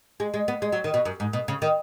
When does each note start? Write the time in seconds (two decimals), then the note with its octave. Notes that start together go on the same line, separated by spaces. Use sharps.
0.20 G#3
0.34 G#3
0.48 B3
0.62 G#3
0.73 F#3
0.84 D#3
0.94 B2
1.05 F#2
1.20 G#2
1.33 B2
1.48 C#3
1.62 D#3